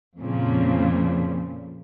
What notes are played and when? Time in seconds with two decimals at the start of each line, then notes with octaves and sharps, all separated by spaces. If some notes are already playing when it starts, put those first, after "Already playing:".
0.18 F2 A#2 C#3 F3